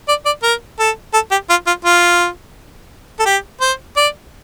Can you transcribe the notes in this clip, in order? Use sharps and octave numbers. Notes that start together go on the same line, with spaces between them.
D5
D5
A#4
A4
A4
G4
F4
F4
F4
A4
G4
C5
D5